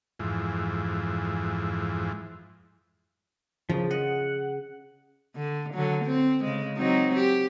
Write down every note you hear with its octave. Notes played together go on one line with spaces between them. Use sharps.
F2 G#2 E3
C#3 F3
D#5 F#5
D3
D3 F#3
C4
C#3 G#3
F#3 C4 D#4
G4